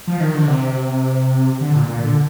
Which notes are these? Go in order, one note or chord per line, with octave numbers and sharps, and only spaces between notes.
F3
D#3
D3
C3
D3
A#2
A#2
D3